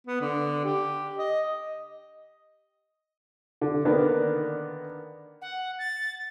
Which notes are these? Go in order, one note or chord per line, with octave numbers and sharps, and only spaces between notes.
B3
D3
G4
D#5
D3
D3 D#3 A#3 B3 D4
F#5
A6